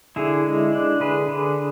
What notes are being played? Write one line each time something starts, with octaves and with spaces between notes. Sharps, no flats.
D3 E4 G#4
G#3
D4
D3 G#4 B4
D3